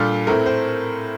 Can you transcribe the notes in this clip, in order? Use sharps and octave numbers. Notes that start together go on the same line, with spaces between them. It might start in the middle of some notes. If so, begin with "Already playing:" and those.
Already playing: A#2 G3 D4 F4 A4
A2 A3 C4 A#4
C5